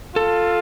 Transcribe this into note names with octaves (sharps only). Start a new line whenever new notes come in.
F4 A4